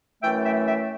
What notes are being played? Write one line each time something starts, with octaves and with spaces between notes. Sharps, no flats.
F#2 E3 A3 E5 G5
E5 G5
E5 G5